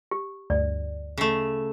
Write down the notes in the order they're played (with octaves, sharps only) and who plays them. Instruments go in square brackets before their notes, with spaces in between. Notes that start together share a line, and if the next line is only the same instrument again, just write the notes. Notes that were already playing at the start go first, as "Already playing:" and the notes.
[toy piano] G4
[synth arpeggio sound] D2 G2 [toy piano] D5
[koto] C#3 A3